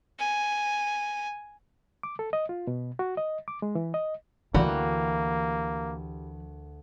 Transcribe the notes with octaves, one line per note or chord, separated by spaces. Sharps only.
G#5
D6
A4
D#5
F4
B2
F#4
D#5
D6
G#3
E3
D#5
D2 E3 G3 A#3 F#4 A#4 E6